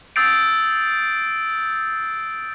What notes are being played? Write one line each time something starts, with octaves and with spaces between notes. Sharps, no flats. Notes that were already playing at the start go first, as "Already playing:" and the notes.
D#6 E6 G6 A6 C7 D7